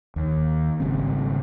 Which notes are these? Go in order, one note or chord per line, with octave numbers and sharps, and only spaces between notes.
D#2
G#1 C#3 G3 C4